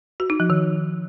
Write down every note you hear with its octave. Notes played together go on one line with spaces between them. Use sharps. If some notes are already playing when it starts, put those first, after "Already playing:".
F#4
D#4
F3
D#3